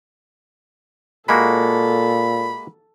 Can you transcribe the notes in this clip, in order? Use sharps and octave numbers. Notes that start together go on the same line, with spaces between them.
A#2 G#3 A#3 F#4 A4 B5